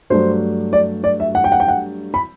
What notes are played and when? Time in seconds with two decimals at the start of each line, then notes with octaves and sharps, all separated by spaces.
0.10 G2 F#3 A3 D4 C5
0.73 D5
1.04 D5
1.20 E5
1.35 F#5
1.44 G5
1.52 F#5
1.60 G5
1.68 F#5
2.14 B5